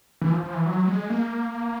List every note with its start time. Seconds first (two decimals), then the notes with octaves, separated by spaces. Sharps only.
0.22 E3
0.32 F3
0.44 F3
0.54 E3
0.66 F#3
0.88 G#3
1.10 A#3